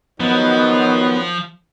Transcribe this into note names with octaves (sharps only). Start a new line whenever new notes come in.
D#3 F3 F#3 B3 D#4